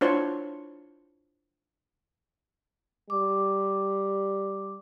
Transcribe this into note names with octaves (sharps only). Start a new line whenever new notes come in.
D4 E4 F4 C5 C#5
G3 D6